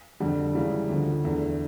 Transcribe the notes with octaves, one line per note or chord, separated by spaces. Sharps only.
F2 D3 G3
C#2 C#3 E3 G3
D2 D3 F3
E2 D3 A3